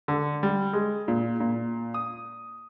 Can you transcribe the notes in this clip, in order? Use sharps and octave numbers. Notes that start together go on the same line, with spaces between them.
D3
G3
G#3
A#2
A#2
D#6